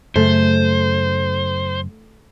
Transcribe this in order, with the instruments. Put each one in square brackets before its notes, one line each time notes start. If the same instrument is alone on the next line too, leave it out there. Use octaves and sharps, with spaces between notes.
[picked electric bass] F#2 C#3 [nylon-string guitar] A3 [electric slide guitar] C5